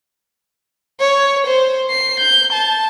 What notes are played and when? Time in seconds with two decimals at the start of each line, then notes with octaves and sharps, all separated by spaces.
1.00 C#5
1.47 C5
1.90 C7
2.20 G6
2.53 A5